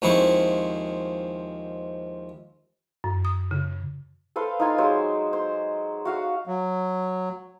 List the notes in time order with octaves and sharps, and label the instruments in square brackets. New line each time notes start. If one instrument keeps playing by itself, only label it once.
[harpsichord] D#2 F3 G#3 C4 E4 C#6
[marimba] F#2
D#6
C#3
[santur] A4 B4 C5 F5
D#4 F4 G#5
F#3 G#3 C5
C5
F#4 F5 F#5 D#6
[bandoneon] F#3